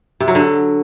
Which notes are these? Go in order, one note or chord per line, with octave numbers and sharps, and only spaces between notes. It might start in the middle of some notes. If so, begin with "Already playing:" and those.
C3
F#3
D3